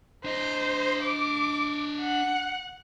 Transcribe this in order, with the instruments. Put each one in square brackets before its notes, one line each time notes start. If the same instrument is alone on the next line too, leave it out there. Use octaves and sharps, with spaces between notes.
[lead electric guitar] D4 D#5 [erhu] C5
[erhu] D6
F#5